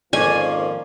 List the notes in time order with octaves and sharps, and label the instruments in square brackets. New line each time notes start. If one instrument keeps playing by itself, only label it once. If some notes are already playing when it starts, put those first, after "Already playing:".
[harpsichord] F2 G#2 C#4 [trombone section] D#3 F3 A#3 [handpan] D5 [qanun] G#5